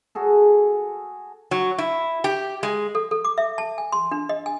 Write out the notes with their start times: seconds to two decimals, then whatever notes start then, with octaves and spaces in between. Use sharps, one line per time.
0.15 F#4 G#4 A4
1.51 F#3
1.78 E4
2.24 G4
2.63 G#3
2.95 A4
3.11 A4
3.25 D6
3.38 E5
3.58 A5
3.78 G#5
3.92 C6
4.12 D4
4.29 D#5
4.46 G#5